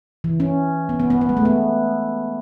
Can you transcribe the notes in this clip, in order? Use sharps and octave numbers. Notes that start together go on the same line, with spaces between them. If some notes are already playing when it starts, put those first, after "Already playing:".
E3
C#4
B3
B3
B3
B3
G#3
A3
B3